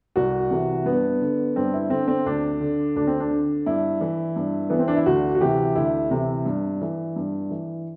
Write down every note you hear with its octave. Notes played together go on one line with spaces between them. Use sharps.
C2 F#4
C3 E3
G2 B3
D3
G2 C4
E4
D3 C4
C4
D2 D4
D3
D2 D4
C4
D4
D3
G2 E4
E3
G2
E3 B3
C4
D4
E4
D2 F#4
F#4
C3 E3 G4
D2 E4
C3 E3
G2
E3
G2
E3